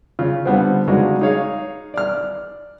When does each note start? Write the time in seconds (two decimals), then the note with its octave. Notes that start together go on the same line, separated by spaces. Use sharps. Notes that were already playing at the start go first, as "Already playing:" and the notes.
0.19 C#3 F4
0.46 D3 G3 B3 C4
0.88 C#3 F#3 G#3 D4 D#4 F#4
1.21 D#4 G#4 C#5 F5
1.94 D5 F6